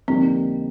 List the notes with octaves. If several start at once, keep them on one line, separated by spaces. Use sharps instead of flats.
F2 D3 G3 A#3 C4 D#4